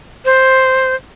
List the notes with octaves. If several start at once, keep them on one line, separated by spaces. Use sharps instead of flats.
C5